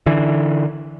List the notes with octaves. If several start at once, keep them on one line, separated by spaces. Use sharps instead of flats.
D3 E3